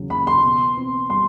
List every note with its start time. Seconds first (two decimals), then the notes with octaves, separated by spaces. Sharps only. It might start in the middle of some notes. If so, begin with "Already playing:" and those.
Already playing: E2 C#3 F#3
0.10 A#3 B5
0.27 C6
0.44 B2
0.77 C4
1.09 G3 C6